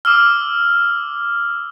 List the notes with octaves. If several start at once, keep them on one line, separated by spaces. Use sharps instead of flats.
D6 E6 F6